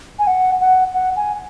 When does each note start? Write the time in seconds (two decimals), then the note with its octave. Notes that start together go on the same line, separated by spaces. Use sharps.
0.19 G#5
0.27 F#5
0.61 F#5
0.94 F#5
1.16 G#5